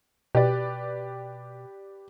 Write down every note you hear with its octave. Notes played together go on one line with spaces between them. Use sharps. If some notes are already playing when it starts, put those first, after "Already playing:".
B2 G4 B4 D5